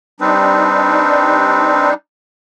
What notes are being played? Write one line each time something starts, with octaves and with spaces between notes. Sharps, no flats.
G3 C4 D4 D#4 B4